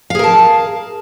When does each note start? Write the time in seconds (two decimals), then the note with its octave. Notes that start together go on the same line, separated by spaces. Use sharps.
0.10 F5
0.15 G#4
0.19 A#4
0.24 A5